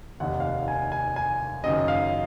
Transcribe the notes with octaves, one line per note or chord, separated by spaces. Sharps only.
F1 D#2 D#3 F#5
F5
F#5
G#5
G#5
G#5
F#1 F#2 D#3 D#5
F5